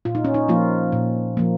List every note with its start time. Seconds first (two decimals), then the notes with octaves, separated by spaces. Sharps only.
0.05 A#2 F4
0.15 D#4
0.24 C#4
0.34 D#4
0.49 F3 A#3 F4
0.92 A#2
1.37 F3 A#3